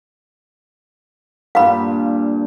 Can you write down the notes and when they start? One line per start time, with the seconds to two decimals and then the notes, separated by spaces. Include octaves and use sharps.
1.55 G2 A#2 F5 B5